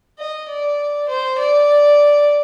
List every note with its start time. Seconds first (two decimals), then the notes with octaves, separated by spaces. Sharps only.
0.19 D#5
0.49 D5
1.09 C5
1.38 D5